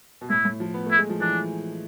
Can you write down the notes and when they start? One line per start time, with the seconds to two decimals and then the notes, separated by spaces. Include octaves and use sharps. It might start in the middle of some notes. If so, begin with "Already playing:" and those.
0.21 B2
0.30 A2 E4
0.45 A2
0.60 F3
0.74 B3
0.86 A3 E4
0.98 G#3
1.10 F3
1.21 E3 D4